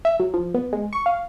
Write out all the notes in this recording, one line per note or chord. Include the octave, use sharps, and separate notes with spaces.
E5
F#3
F3
B3
G#3
C#6
F5